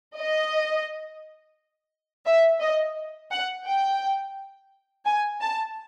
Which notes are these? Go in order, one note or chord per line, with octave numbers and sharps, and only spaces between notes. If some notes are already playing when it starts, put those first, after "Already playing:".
D#5
E5
D#5
F#5
G5
G#5
A5